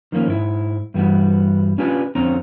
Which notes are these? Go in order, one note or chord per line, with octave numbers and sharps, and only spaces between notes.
D#3 F3 A#3 C#4
G#2 E4
G2 E3 G3 B3 F#4
C#4 D4 F4 G4 B4 G#5
F2 D3 C4 C#4 A#5